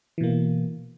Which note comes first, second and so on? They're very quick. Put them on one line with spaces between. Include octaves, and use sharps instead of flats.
E3 B2 A#3